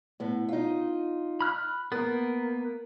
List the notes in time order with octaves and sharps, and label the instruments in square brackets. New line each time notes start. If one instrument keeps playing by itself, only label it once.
[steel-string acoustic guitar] A2 B3
D#4 F4
[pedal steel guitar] B5 F6 F#6
[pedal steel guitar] A#3 B3 [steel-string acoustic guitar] A#4